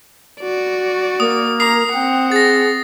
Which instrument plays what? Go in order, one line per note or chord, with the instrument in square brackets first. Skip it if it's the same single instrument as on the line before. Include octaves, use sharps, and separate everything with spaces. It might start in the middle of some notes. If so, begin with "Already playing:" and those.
[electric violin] F#4 D5
[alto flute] A#3 [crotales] D#6
[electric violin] A#5 [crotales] D#6 C7
[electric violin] C4 F#5 [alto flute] G5
[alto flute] G#4 [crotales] A6 A#6